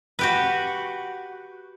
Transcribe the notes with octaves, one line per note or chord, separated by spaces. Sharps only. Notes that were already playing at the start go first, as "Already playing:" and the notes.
F#4 G4 B4